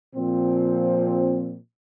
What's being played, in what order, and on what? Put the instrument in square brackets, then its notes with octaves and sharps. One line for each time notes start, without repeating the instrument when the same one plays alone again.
[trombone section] A#2 F3 C4